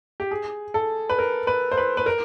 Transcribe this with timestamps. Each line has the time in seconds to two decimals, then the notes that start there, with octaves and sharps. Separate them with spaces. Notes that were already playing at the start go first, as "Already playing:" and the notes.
0.20 G4
0.31 G#4
0.74 A4
1.10 B4
1.19 A#4
1.47 B4
1.72 C5
1.78 B4
1.97 B4
2.06 A#4